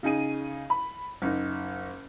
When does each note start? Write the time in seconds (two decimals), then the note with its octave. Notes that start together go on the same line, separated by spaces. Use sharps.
0.03 C#3 D#4 G#4 D#7
0.70 B5
1.22 F#1 D#4